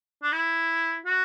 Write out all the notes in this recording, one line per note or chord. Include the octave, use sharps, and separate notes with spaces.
D4
E4
F#4